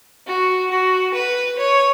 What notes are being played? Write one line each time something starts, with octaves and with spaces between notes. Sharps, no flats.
F#4
F#4
B4
C#5